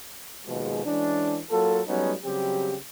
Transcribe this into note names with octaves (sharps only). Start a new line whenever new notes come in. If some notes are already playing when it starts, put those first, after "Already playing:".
D#2 B2 F3 G#3
E3 G#3 C#4 D4
F#3 A#3 F4 A4
F#3 G3 A3 B3 C#4 D#4
C#3 F#3 G3 C4 G4